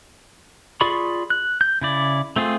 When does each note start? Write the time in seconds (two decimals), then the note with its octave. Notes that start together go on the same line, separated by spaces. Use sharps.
0.81 F4 G#4 D5 B5 C#6
1.30 F#6
1.61 G6
1.81 C#3 E4 D5
2.36 A3 C4 F4 G#4